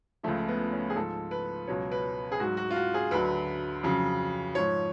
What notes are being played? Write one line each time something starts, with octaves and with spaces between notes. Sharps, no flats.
C#2 C#3 F3 A3
B3
C#4
G#4
G#2 F3 A4
B4
C#2 B2 F#3 C#5
B4
G#4
G#2 F#3 F#4
F#4
F4
F#4
G#4
D2 D3 F#3 B4
F2 C#3 F#3
G#2 F3 C#5